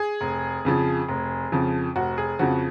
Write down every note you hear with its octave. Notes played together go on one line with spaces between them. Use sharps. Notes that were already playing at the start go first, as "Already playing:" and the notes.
Already playing: G#4
F1
F2 C#3 F3
F1
F2 C#3 F3
F1 F#4
G#4
F2 C#3 F3 F#4